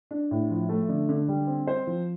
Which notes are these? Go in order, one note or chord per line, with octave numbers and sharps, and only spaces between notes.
D4
A2
F3
A3
D3
D3
G3
C4
C5
F3